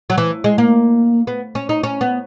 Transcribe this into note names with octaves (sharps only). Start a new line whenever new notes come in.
F#3
E3
G#3
A#3
B3
C#4
D#4
C#4
B3